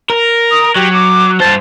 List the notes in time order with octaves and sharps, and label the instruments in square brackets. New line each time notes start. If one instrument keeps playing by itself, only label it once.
[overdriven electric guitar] A#4
[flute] D#6
[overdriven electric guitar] F#3 [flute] G4
[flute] D6
[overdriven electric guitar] G2 C5 [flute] A5